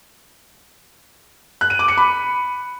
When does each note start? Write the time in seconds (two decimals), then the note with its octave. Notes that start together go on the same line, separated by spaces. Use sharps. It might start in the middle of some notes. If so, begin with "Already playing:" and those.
1.61 F#6
1.70 D#7
1.79 D6
1.88 C#7
1.97 B5